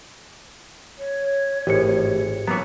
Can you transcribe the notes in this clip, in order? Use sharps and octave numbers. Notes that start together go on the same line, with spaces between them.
C#5
G#1 A2 E3 G4 C#7
E3 F#3 A#3 B3 C#5 A#5